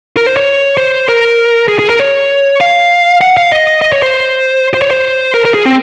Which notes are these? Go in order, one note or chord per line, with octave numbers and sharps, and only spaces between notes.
A#4
C5
C#5
C5
A#4
G#4
G#4
A#4
C#5
F5
F#5
F5
D#5
D#5
C#5
C5
C5
C#5
C5
A#4
A#4
G#4
C4